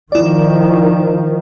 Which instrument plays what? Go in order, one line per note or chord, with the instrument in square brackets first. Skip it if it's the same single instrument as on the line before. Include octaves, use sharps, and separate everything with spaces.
[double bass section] D#3 F3 [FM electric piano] E4 D5